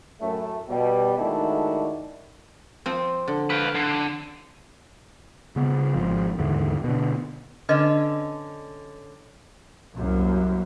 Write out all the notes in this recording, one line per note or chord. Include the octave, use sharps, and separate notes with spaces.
F#2 A2 A3
B2 G3
D#3 G#3 A3 D4 E4 F#4
F3 C4
D3
B4 F5 G5
D3
C#3 B3
G#1 F3
D#2 G#2 D3 E3
B2 D3
D3 C#4 B4 D5 D#5
C2 F#2 A#3